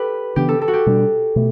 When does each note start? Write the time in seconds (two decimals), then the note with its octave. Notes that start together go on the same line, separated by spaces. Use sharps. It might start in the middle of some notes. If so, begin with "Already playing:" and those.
Already playing: G4 A4 B4
0.36 C#3 E3 B3 D4 G4
0.49 A4
0.62 A4
0.68 F#4
0.73 G4
0.86 B2 G3 D4
1.36 B2 A3